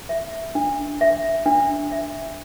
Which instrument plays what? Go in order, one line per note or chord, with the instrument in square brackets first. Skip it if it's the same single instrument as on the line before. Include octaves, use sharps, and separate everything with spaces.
[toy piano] E5
D4
E5
D4
E5